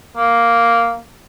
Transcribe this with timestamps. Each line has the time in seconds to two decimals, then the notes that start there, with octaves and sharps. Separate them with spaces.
0.17 A#3